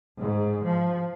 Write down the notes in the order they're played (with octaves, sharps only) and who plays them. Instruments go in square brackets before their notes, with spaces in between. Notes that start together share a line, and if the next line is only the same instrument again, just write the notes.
[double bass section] G#2
F3